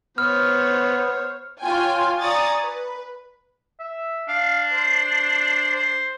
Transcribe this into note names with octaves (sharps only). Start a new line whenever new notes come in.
B3 C5 C#5 F6
F4 C#5 G5 G#5
D5 G#5 A#5 C#6 D#6 A6
B4
E5
D4 F5
C5
C5